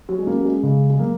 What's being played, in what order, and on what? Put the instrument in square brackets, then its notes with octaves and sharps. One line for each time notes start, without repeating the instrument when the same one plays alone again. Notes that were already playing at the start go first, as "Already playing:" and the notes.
[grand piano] F#3
G#3
[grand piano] A#3 [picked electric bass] C#4
[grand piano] F#3
G#3
[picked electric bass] C#3 [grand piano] G#3
[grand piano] G#3
[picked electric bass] F#3 [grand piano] A#3